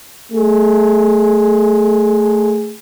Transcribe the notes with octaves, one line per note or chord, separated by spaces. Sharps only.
A3 G#4